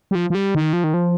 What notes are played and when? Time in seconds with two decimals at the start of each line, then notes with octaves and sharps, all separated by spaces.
0.11 G3
0.15 F3
0.30 F3
0.35 G3
0.55 D#3
0.73 F3
0.84 D#3
0.94 F3